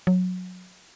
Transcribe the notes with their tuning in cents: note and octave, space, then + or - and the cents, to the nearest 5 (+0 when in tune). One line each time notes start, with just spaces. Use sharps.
F#3 -20